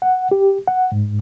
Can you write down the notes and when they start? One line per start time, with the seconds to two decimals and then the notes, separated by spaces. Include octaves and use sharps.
0.02 F#5
0.31 G4
0.68 F#5
0.92 G#2